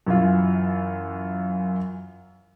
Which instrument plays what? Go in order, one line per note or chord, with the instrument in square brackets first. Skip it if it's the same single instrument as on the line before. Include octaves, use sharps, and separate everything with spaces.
[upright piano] F#2 E3 E4 F4